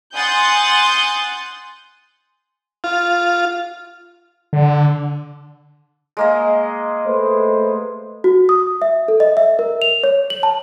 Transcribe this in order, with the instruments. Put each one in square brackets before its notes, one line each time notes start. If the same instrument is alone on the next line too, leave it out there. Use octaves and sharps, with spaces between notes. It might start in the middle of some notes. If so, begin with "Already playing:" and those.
[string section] F#5 G#5 C6 D#6 G6 A6
[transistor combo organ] F4
[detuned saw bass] D3
[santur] G#3 A#3 D#5
[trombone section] A3 B4 C5
[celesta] F#4
D#6
E5
A4
D#5
E5
A#4
F7
C#5
F#7
A5